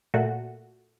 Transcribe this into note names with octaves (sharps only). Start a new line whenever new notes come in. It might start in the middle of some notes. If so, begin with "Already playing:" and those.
A#2 A3 F#4